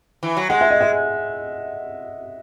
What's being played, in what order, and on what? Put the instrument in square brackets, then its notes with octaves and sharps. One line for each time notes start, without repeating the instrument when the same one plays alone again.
[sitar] E3
F#3
[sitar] G#3 [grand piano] F#5
[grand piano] E5
D#5
E5